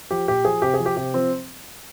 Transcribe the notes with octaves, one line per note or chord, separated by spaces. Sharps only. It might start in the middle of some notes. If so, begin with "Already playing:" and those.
F3 G4
A#2 G4
F3 G#4
C3 G4
G#4
F3
G4
C3 G4
F3 C4